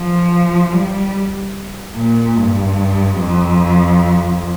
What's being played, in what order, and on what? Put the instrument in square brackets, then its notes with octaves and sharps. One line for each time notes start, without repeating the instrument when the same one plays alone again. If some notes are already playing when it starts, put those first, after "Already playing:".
Already playing: [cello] F3
G3
A#2
G2
F2